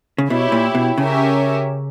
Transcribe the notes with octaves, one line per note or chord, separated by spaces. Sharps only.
C#3
B2 E4 G4 C#5 E5
A#2
B2
C#3 C#4 G4 A#4 C#5 E5